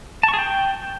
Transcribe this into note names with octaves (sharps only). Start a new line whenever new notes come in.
A5
C#6
G#4
G5